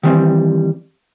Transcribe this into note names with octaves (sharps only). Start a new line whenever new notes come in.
D#3 E3 G3 C4